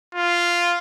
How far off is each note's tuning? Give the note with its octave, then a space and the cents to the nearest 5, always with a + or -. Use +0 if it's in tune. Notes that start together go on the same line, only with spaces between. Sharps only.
F4 -5